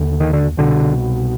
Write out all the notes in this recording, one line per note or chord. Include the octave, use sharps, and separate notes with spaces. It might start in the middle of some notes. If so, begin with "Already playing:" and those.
Already playing: D#2 D3
D#3
D3
C2 B2 D3